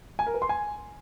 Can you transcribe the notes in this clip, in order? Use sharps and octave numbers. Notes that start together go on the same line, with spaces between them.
G#5
A#4
B4
C6
G#5